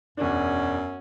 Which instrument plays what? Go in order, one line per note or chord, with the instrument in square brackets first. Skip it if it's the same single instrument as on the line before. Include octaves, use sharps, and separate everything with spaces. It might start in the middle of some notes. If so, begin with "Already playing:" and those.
[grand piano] E1 D4 [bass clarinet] F#2 [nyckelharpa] C#4 F#4